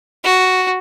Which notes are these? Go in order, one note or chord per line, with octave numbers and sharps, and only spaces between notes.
F#4